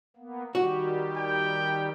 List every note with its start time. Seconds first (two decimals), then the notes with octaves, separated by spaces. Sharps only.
0.17 A#3 B3
0.55 D#3 G3 F#4 G4
1.17 G5